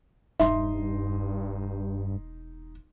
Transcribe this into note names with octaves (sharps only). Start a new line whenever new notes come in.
E1 G2 D#4 E5 C6